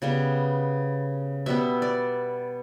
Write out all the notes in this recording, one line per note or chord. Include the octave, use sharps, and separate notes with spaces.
C#3 G3 B3
B2 G3 B3 E5
D5